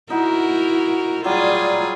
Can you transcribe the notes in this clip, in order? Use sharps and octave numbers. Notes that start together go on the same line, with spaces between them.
D#4 E4 F#4 A#4 F#5
F#3 G3 F4 G#4 D5